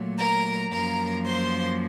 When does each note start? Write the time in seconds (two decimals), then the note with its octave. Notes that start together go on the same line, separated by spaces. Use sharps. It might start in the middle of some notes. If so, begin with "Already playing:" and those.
Already playing: A#2 F#3 A3
0.18 A#4 A#5
0.71 F#2 F3 A#3 A#4 A#5
1.25 C5 C6